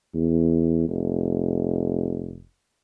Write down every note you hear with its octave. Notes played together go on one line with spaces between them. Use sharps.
E2
F1